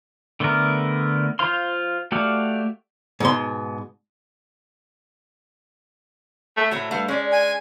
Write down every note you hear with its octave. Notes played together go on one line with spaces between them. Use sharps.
D3 A3 B3 G4 A#4
F4 C5 F5 C6
A3 F#4 G4 D5 F5
G#2 B2 C6
A3
A2 F#3 A3 C4
G2 A3 A4 F5
G#3 C#4 D5
G#5